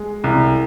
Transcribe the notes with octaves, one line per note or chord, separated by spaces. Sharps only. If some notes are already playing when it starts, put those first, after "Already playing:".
Already playing: G#3
C2